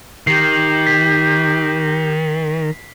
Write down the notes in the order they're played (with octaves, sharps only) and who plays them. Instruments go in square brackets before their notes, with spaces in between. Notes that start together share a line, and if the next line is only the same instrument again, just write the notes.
[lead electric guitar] D#3 [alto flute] G4 [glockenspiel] C7
[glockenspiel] B6